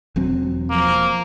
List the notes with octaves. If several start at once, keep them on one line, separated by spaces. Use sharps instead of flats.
E1 F#3 C4
F3 A#3